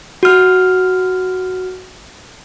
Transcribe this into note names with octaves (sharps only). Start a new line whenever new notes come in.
F#4 F6